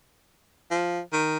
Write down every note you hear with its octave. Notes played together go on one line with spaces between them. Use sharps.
F3
D#3